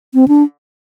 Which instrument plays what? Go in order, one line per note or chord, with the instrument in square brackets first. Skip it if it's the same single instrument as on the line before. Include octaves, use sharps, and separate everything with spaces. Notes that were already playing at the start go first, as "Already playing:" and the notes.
[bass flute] C4
D4